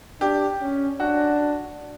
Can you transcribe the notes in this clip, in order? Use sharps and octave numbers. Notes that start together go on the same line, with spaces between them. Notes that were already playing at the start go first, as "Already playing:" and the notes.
D4 G4
C#4
D4 F#4